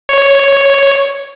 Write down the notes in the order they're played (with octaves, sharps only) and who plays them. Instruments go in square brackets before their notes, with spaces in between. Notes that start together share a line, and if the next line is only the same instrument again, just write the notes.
[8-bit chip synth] C#5